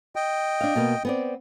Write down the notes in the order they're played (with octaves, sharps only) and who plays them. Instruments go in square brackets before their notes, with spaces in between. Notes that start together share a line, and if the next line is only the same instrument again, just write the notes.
[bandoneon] D#5 G5
[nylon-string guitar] D4 F5
B2 A#3 B3
B3 C4 D5